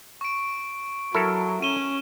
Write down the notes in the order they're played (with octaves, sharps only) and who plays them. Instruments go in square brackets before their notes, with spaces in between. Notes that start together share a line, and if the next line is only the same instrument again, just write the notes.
[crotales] C#6 D7
[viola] F#3 [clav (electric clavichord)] E4 A4 A#4
[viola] C#4 [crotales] D#7 E7 G7